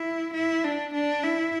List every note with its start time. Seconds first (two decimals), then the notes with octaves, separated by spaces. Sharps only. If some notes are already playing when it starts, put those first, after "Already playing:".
Already playing: E4
0.34 E4
0.64 D4
0.94 D4
1.23 E4